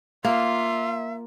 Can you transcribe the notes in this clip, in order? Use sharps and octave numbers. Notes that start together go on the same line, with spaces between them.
A#3 F4 E5